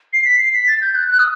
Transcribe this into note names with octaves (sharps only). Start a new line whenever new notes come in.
C7
B6
C7
B6
A6
G6
F#6
F#6
D#6